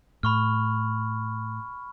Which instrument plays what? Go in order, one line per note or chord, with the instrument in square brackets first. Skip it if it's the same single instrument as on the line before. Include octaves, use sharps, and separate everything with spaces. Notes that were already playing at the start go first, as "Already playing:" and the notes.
[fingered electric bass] A2 [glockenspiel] B5 C#6 F6